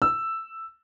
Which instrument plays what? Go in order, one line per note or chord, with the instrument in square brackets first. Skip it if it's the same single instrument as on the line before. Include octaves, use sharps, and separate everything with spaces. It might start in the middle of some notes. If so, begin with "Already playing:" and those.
[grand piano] E6